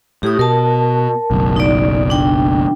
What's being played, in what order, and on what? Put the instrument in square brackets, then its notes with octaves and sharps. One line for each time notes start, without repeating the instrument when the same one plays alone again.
[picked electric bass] A2 [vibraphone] G4 D#6
[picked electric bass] B2 [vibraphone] A#4 A5
[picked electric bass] F#1 B1
[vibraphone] D#4 D5
D4 G5